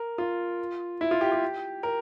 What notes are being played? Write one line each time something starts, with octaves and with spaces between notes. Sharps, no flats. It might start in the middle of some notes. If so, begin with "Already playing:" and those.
Already playing: A#4
F4
E4
F4
G4
G4
A#4